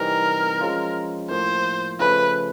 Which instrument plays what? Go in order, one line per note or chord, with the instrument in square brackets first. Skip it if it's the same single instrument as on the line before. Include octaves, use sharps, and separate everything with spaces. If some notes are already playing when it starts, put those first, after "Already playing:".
Already playing: [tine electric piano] C3 E3 G3 C4 D#4 [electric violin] A#4
[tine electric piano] F3 G#3 C#4 F4
[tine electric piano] A2 F3 A#3 [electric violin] C5
[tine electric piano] C#3 F3 A3 C#4 [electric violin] B4